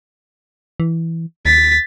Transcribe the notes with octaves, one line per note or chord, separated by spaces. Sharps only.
E3
D#2 A6 B6